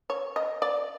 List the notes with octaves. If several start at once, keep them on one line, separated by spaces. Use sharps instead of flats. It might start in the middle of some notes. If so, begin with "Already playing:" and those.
C#5
D#5
D5